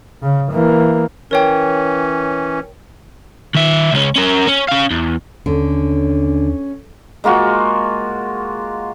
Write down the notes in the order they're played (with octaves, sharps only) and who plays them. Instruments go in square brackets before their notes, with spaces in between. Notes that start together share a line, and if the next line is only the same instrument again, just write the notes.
[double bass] C#3
E3 A#3
[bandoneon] E3 C#4 [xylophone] A#4 C#5 G5
[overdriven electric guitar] D#3 E5
C#2 C#4
C#4 A#4
C#4
C#4 F5
E2
[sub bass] D#2 [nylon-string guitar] D3 [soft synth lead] C#4
[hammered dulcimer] G#3 A#3 F4 F#4